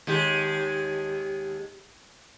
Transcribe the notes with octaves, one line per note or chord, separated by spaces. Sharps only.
D#2 G#3 G4